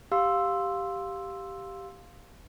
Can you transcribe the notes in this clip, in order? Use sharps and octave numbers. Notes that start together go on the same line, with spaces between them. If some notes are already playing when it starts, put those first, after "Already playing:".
G4 F5 C6 E6